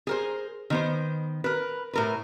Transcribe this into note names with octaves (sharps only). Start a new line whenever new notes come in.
G#4 A#4 C5
D#3 B3 C5
A#4 B4
A2 A#4 B4